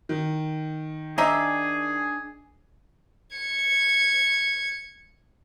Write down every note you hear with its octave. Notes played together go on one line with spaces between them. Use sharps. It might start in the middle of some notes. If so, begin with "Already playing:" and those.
D#3
D4 D#4 G#4 E5 G#5 D6
G#6 C#7